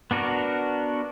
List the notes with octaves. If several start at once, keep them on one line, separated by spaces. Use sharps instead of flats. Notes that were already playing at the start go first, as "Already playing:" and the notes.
B3 D4 F#4 A#4